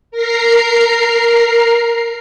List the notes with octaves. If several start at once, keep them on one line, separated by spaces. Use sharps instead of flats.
A#4 A#5 C7